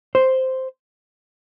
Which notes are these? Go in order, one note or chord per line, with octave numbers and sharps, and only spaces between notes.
C5